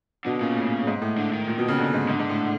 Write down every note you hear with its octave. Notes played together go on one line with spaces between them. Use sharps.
B2 D3
A#2 C#3
A2
G#2
A2
D3
D#3
A#2
B2
C#3
D3
G#2
G#2 D3
G#2
A2